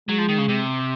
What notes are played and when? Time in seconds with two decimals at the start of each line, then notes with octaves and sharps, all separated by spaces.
0.08 F#3 G#3
0.18 F3
0.29 D#3
0.38 C#3
0.48 C3